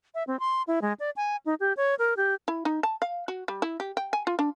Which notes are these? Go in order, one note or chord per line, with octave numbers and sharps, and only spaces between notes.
E5
C4
C6
E4
G#3
D5
G#5
D#4
G4
C#5
A#4
G4
E4
D#4
A5
F5
F#4
G3
E4
G4
G5
G#5
F4
D4